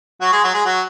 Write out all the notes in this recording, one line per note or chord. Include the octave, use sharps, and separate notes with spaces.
F#3 F#4
G#3 G#4
F#3 F#4
G#3 G#4
F#3 F#4